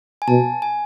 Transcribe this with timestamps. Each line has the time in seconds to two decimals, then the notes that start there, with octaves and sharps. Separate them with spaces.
0.22 G#5
0.28 B2 A5
0.62 G#5